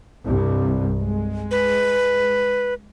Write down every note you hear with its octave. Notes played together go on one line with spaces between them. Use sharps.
C2 G2
G#3
B4